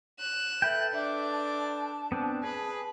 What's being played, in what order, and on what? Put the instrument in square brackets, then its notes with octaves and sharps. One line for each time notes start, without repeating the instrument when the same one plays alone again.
[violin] F#6 E7
[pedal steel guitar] A4 B4 G5 [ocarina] E5
[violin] D4 D6 [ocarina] E5
[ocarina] A5
[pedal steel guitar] B3 C4 D4
[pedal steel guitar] G#4 [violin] B4